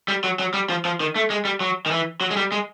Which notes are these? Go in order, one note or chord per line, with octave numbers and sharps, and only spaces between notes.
G3
F#3
F#3
G3
F3
F3
D#3
A3
G#3
G3
F#3
D#3
E3
F#3
G#3
G3
G#3